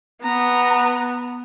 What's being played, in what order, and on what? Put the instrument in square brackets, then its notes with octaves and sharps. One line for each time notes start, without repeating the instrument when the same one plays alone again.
[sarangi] B3 [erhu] A#5